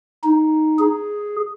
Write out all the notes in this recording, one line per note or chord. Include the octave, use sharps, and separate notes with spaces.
D#4
G#4